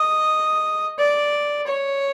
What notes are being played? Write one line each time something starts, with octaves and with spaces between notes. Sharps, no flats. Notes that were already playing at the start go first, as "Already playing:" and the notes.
Already playing: D#5
D5
C#5